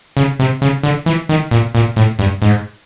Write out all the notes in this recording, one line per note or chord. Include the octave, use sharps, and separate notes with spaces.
C#3
C3
C#3
D3
E3
D#3
A#2
A#2
A2
G2
G#2